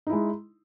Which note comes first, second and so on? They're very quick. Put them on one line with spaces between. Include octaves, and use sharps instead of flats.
D#4 E4 G#3